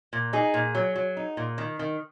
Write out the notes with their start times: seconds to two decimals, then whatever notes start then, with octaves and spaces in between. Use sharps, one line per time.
0.13 A#2
0.33 D#4 G#4
0.54 A#2
0.75 F#3
0.96 F#3
1.17 D#4
1.37 A#2
1.58 D#3
1.79 D#3